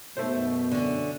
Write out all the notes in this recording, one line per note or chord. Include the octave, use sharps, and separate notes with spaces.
F#2 B2 A3 C5
D3 C#4